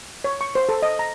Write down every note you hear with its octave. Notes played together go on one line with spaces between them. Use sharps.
C#5
C#6
C5
A4
D#5
A#5